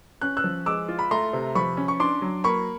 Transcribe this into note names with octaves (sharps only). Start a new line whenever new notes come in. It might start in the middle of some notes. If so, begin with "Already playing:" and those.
C#4 F#6
E6 F#6
F3
G#3 D6 E6
F4
B5
A3 A#5 C6
C3
F3 B5 C#6
C#4
C#6
D4 C6 D6
F#3
A#3 B5 C#6